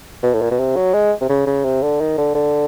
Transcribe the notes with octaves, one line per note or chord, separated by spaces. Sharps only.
B2
A2
A#2
B2
C3
F#3
G#3
C3
C#3
C#3
C3
D3
D#3
D3
D3